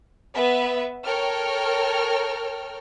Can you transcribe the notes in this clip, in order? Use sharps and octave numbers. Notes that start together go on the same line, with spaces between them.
B3 B4 E5
A4 A#4 C#5 G5 F6